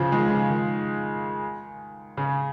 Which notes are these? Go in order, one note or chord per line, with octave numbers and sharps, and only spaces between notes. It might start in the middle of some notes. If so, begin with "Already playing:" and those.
Already playing: C#3 F3
D#3 G#3
C#3 F3
D#3
C#3